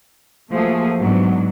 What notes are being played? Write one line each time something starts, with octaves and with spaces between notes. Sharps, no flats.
F3 F#3 A3 A#3 G#4
G#2 F#3 B3 D4